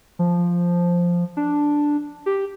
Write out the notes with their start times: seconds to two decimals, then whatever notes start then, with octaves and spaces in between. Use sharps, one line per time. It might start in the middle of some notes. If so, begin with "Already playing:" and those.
0.19 F3
1.37 D4
2.26 G4